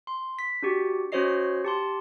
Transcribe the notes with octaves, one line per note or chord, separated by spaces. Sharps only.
C6
B6
D4 F#4 G4
C#4 F#4 C5 C#5 D#5 C7
G4 A5 C6